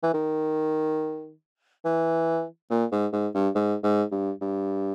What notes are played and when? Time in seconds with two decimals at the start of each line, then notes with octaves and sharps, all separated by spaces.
0.03 E3
0.14 D#3
1.85 E3
2.70 A#2
2.92 G#2
3.13 G#2
3.35 G2
3.55 G#2
3.84 G#2
4.12 G2
4.41 G2